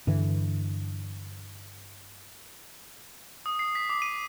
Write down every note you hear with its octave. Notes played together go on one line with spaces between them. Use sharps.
G2 D3 E3
D#6
C7
B6
D6
D#7